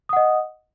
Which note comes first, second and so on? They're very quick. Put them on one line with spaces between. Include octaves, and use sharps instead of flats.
D#6 F#5 D#5